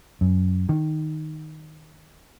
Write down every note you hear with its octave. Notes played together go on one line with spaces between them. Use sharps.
F#2
D#3